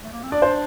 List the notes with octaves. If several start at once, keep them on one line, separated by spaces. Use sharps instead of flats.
A3
A#3
C4
D4 D5
C5